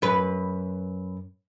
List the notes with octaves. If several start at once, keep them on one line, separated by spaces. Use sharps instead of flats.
F#2 B4